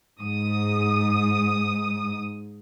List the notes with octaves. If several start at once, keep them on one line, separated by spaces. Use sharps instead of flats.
G#2 D#6